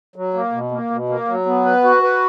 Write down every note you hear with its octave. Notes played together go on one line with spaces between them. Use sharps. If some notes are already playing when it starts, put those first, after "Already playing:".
F#3
A#3
B2
A#3
B2
A#3
F#3
B3
B4
F#4
B4